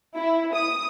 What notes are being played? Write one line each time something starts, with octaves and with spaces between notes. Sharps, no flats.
E4
D#6